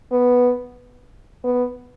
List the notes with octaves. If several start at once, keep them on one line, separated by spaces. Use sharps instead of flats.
B3
B3